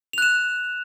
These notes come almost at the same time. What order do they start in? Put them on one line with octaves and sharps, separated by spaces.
F7 F#6 E7